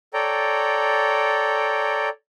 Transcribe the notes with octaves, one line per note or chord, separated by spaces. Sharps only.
A4 C#5 D5 G5 A#5